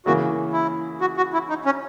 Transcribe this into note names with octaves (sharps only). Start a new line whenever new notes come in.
C#3 E3 A#3 F#4
E4
F#4
F#4
E4
D#4
C#4